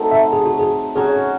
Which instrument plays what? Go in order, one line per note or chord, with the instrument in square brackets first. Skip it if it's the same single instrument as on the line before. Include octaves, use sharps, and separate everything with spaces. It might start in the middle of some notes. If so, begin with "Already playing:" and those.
Already playing: [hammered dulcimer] F#3 A3 C4 D#4
[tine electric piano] E5
G#4
F#4
G#4
[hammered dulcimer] F#3 C#4 F#4 [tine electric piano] G#4